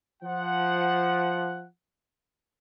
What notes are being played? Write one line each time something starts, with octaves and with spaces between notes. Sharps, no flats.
F3 F#5